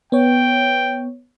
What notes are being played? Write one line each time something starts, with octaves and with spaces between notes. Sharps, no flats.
B3 C#5 G5